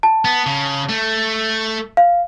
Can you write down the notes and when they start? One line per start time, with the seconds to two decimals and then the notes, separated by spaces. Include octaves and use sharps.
0.03 A5
0.25 B3
0.46 C#3
0.89 A3
1.97 F5